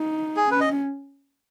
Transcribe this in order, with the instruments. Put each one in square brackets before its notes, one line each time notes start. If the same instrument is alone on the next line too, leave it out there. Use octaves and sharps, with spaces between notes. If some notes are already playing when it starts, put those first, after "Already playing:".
Already playing: [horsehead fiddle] D#4
[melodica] G#4
[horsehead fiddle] C#4 [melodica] B4
[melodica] D#5